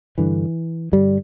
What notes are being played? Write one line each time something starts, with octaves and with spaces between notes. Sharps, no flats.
G2 D3 E3
G2 D3 G3